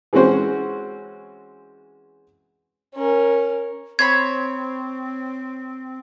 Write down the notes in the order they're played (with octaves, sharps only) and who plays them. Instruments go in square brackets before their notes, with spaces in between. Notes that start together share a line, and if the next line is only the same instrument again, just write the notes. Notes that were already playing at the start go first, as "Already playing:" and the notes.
[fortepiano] E3 G#3 C4 C#4 F#4 C5
[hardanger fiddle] C#4 A#4
[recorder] C4 [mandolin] C5 C#5 B5 [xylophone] G#6